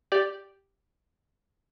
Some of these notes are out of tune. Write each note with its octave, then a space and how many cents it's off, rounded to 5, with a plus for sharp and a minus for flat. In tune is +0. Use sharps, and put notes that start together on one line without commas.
G4 +0 D5 +0